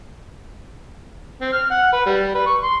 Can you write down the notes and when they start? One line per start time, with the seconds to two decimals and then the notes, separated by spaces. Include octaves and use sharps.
1.41 C4
1.53 F6
1.70 F#5
1.93 B4
2.06 G3
2.34 B4
2.46 C#6
2.62 C6